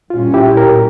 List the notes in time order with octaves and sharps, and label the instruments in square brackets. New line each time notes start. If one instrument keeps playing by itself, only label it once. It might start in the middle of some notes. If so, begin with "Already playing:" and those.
[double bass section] A#2 G3 C#4 [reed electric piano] F4
[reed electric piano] E4 G4
G4 A#4